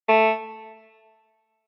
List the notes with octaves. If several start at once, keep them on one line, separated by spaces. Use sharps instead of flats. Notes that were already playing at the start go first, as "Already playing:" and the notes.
A3